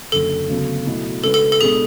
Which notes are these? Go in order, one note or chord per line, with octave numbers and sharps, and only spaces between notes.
F#1 F#2 D3 A4
D2 C#3 F#3 B3
B2 F#3 A3 E4
C#3 G#3 D4 F#4 A4 B4
A4
A4
B2 G#3 B3 D4 G#4